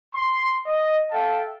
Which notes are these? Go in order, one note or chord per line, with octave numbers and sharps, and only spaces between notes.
C6
D#5
A4 E5 F5 G5 A5